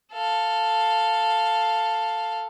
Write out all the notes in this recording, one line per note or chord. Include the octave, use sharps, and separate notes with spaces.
A4 F5